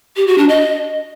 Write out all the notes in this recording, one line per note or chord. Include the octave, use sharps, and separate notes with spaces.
G4
F#4
D4
D#5